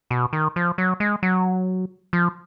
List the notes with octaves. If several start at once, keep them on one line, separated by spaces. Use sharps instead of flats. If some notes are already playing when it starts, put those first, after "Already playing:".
B2
D#3
F3
F#3
G#3
F#3
F3